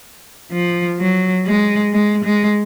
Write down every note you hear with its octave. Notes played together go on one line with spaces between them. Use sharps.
F3
F#3
G#3
G#3
G#3